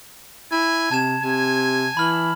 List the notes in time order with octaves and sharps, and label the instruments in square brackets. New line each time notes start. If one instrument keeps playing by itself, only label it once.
[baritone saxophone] E4 [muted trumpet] G#5
[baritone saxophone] C3 [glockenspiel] A5 G#6 E7
[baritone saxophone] C3 [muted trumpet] G#5
[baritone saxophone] E3 [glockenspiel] B5 F6 F#7